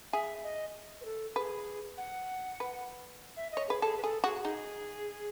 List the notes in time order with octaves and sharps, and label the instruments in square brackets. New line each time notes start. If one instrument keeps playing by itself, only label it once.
[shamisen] G#4 [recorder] E5
[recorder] D#5
B4
A4
[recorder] G#4 [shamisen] B4
[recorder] F#5
[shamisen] B4
[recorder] E5
D#5
[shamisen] C#5
[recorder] G#4 [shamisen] B4
[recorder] G#4 [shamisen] A4
[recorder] B4
[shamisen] G#4 [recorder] A4
[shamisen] F#4 [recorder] G#4
[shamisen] D#4 [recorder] G#4